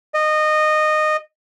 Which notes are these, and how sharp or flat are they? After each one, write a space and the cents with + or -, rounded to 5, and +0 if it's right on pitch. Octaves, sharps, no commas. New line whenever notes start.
D#5 -20